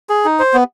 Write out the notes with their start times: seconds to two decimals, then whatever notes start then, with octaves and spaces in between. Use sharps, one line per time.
0.09 G#4
0.25 D#4
0.39 C5
0.54 B3